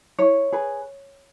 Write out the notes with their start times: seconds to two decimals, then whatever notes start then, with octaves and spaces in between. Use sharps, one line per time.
0.18 E4 C#5
0.52 G#4 B4